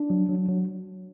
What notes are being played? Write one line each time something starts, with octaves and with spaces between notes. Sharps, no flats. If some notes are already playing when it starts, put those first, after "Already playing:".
Already playing: D4
F#3
F#3
F#3